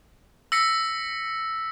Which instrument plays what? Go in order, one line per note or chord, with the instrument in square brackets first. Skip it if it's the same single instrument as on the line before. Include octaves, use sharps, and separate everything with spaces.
[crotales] E6 A#6 B6 C#7